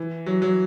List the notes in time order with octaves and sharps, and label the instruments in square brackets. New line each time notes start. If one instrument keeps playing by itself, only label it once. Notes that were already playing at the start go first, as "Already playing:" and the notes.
Already playing: [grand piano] E3
F#3
F#3